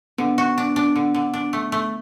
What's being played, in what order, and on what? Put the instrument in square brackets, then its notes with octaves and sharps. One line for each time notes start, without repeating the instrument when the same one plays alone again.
[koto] D3 [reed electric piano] B3
[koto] F#4
D4
D4
D3
D3
D4
A3
A3